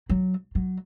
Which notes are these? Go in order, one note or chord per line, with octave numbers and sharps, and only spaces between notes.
F#3
F#3